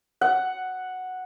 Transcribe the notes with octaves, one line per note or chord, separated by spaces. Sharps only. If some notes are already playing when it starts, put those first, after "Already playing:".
F#5